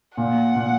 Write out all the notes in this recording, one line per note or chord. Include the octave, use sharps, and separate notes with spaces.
A#2 F#5
A#2